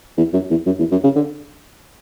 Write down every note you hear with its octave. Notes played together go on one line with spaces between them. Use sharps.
E2
F#2
E2
F#2
E2
F#2
C#3
D3